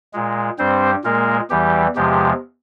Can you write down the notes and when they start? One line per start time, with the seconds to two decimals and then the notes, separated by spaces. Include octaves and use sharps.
0.13 A#2 G#3
0.59 G2 G3 C4 C5
1.04 A#2 G#3 A#3 A#4
1.50 E2 E3 G3 G4
1.96 E2 C3 F3 G#3 G4